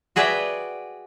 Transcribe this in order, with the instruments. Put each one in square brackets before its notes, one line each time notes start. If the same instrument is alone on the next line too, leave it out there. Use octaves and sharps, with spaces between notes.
[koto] F#4 G#4 B4 D5 E5 G5